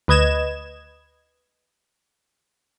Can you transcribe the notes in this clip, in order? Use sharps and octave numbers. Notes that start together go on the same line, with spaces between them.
D2 B4 D#5 G#6 E7